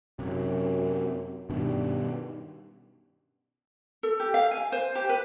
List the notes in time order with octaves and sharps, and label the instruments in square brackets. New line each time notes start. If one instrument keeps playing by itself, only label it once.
[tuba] F#2 [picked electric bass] C3 F#3
[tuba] G2 [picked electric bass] B2 D#3
[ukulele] A4
G4
F5
G#5
C5
G4
B4